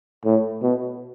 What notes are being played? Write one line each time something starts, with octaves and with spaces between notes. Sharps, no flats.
A2
B2